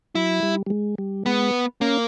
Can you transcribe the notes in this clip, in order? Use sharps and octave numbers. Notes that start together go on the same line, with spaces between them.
F#3 E4
G3
G3
G#3
G3
G#3 B3
A#3 C#4